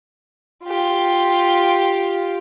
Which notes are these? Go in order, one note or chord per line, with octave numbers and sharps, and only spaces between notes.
F4 G4